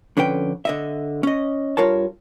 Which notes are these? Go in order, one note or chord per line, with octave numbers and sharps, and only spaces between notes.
F2 D3 C#4 B4 G5
D3 D#5 E5
C#4 D#5
G2 F4 A#4 C#5 A5